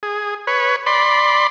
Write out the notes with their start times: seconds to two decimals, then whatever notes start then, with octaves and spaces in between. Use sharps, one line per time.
0.03 G#4
0.47 B4 C#5
0.86 D5 B5 C6